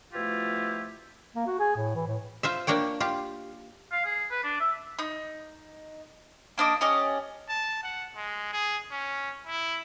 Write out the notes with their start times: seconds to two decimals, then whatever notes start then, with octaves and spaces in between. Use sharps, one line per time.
0.13 B2 F3 A3 E4 F4 G4
1.36 A#3
1.47 F#4
1.59 G#4
1.76 A2
1.95 E3
2.07 A2
2.43 F4 C5 E5
2.67 A#3 D4 C#5 G5
3.00 F4 G4
3.92 F5
4.05 G#4
4.31 B4
4.44 D4
4.60 E5
4.99 D#4
6.58 A#3 D4 D#5 D6
6.81 C#4 G4 D5 D#5
7.49 A5
7.83 F#5
8.17 G#3
8.53 G#4
8.91 C#4
9.47 E4